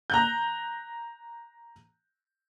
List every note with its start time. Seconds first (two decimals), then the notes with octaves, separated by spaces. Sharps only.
0.10 A#5 F#6 G6